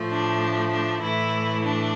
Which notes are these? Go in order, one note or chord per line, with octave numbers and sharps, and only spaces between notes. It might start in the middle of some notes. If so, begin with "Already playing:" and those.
Already playing: A2 F3 A3
D4
D4
A2 E3 A3 E4
D4